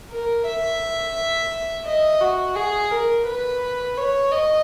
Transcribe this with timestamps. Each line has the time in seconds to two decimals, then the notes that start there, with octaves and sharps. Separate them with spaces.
0.11 A#4
0.46 E5
1.86 D#5
2.21 F#4
2.56 G#4
2.91 A#4
3.26 B4
3.98 C#5
4.32 D#5